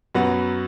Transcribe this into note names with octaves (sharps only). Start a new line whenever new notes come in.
F#2 F#3 B3 F#4